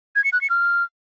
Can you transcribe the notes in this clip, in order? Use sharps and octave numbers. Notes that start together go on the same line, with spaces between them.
G#6
C#7
F#6
C#7
F6